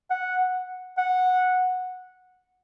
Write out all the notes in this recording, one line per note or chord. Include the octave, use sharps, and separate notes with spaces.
F#5
F#5